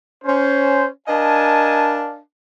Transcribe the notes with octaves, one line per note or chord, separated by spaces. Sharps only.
C#4 C5
D4 A#4 D#5 F5 G#5 A5